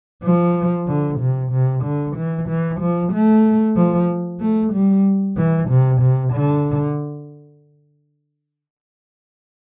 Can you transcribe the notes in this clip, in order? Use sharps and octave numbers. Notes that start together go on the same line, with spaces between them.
F3
D3
C3
C3
D3
E3
E3
F3
A3
F3
A3
G3
E3
C3
C3
D3